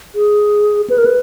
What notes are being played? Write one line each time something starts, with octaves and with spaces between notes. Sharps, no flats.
G#4
B4
A#4
B4